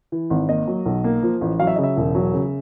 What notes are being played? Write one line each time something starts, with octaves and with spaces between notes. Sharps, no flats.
E3
G#1
A#3 D#5
F#3
B1
A#3
F3
A1
F#3 F5
E5
C#3 D#5
E5
E1
F#3
C#3